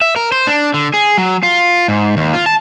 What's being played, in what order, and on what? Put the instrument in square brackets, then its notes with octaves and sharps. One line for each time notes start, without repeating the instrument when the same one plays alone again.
[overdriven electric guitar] E5
A#4
C5
D4
D3
G#4
F#3
F4
G#2
D#2
F4
A5